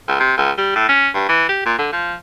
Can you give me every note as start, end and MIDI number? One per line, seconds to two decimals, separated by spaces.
0.08 0.20 37
0.20 0.37 48
0.38 0.51 37
0.58 0.73 55
0.76 0.85 45
0.89 1.08 61
1.14 1.29 43
1.29 1.46 52
1.49 1.64 67
1.66 1.74 46
1.78 1.88 50
1.92 2.15 53